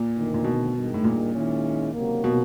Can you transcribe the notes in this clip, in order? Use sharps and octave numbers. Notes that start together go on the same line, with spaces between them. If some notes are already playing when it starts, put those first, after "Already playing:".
Already playing: A#2
D2 C3 D#3
A#2
B2
G2 D#3 G#3
A2
A#2
D#3 G#3 C#4 E4
C#2 C3 D#3 F#3 A#3
B2